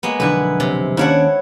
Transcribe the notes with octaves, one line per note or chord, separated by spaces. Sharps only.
G#3 A#3 B3
B1 F2 D3 E4 B4
C3
D#2 C#4 D4 E4 C#5 F#5